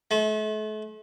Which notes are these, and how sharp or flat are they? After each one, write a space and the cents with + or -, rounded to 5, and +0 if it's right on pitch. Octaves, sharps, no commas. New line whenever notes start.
A3 -40